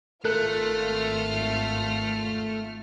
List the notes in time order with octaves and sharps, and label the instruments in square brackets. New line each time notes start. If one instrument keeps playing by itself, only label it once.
[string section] G#1 F4 F6 [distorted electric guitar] A3 [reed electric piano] A4 A#4 F#6